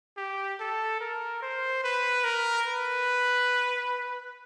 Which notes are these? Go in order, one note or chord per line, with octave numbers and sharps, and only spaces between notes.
G4
A4
A#4
C5
B4
A#4
B4